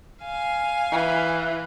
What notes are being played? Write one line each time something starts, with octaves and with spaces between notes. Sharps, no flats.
F5 G#5
E3